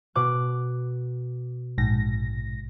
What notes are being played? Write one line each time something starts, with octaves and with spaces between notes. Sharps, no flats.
B2 D6 F#6
A#1 G#2 A#6